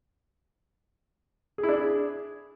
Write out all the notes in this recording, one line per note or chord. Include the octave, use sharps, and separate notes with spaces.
G#4
E4
D4
G#4